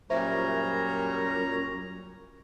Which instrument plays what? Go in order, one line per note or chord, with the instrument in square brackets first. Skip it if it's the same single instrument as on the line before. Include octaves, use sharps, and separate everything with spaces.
[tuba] F#2 [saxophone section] A#2 G3 [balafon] C5 E5 [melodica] C#5 A#5